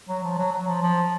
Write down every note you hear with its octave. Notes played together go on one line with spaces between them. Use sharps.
F#3
F3
F#3
F#3
F3
F3